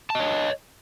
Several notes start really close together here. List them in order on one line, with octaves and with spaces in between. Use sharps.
A5 D#5 C#5